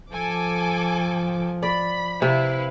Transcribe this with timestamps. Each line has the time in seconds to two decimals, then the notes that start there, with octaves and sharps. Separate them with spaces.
0.12 F3 A4 G#5 D6
1.63 D5 B5
2.22 C3 E4 B4 F5